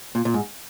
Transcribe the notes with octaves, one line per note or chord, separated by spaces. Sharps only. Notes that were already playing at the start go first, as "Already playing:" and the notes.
A#2
A#2
G#2